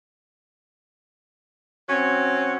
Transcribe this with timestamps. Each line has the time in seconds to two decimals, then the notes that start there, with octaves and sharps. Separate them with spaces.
1.89 F#3 C4 C#4